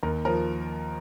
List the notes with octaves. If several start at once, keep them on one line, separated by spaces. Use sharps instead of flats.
D#2 A#4
F3 A#4